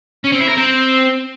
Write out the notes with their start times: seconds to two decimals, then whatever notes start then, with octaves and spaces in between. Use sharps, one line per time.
0.24 C#4
0.32 C4
0.40 E4
0.49 A#4
0.57 C4